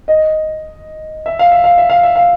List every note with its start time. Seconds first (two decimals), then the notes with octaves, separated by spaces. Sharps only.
0.08 D#5
1.26 E5
1.39 F5
1.52 E5
1.64 F5
1.78 E5
1.90 F5
2.03 E5
2.16 F5